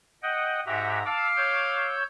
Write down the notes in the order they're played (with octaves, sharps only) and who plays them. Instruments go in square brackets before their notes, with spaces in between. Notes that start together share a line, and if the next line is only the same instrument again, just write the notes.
[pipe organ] D#5 F#5 G5
[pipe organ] G#2 E5 A#5 [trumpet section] F#4 G4
[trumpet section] F5 D6 [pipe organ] A5 E6
[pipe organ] C#5 E6 G6